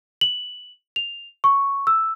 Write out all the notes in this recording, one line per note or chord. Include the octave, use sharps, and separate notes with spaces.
F#7
F7
C#6
E6